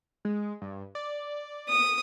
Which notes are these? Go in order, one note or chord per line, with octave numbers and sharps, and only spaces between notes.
G#3
G2
D5
D#6